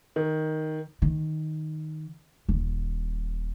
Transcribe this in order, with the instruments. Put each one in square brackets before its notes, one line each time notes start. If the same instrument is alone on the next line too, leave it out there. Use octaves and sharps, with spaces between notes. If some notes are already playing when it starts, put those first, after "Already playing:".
[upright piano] D#3
[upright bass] D#3
D#1 D#3